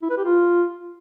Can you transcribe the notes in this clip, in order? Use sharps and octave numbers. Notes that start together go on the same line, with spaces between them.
E4
B4
G4
F4